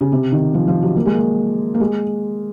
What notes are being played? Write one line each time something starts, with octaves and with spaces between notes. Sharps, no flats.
C#3
C3
D#3
F3
F3
F#3
A#3
G#3
A#3
A#3
G#3